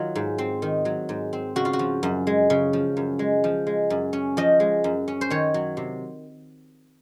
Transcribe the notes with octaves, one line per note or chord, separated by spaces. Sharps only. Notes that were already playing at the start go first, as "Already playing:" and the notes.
Already playing: D#3 F#3 F4
G#2
C4
D#3
F#3
G#2
C4
C#3 F#4
F4
F#4
F3
F#2
G#3
C#3
F3
F#2
G#3
F3
G#3
F#2
C#4
F3 D#5
G#3
F#2
C#4
C5
D#3 C#5
F#3
C3